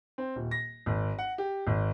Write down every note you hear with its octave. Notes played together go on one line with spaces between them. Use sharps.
C4
D#1
A#6
G#1
F#5
G4
G#1